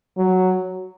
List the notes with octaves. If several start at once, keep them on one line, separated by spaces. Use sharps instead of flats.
F#3